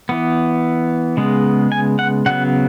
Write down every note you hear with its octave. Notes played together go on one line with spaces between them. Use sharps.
E3 B3
C#3 G#3 B3
G#5
F#5
C#3 F#3 B3 F#5